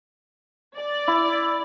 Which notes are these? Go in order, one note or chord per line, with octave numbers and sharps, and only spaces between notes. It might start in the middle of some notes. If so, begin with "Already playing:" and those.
D5
E4